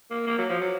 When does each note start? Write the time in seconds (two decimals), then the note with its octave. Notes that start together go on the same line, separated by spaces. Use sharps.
0.10 A#3
0.27 A#3
0.38 F#3
0.50 F3
0.60 F#3